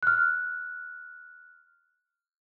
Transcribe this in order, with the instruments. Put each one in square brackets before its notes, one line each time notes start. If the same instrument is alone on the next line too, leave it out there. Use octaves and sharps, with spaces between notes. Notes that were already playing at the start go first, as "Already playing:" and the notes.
[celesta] F6 F#6